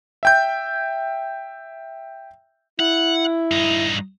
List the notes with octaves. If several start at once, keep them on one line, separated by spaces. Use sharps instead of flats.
E5 G5 G6
E4 F#5
G2 D#4